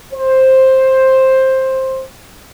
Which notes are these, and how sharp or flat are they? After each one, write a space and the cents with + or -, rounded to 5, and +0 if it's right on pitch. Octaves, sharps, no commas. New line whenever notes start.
C5 +10